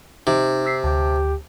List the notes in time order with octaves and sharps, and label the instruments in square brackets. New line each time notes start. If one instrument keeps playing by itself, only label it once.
[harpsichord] C3 [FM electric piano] D#4
[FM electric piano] E6 B6 C7
[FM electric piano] D2 A5 [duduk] G4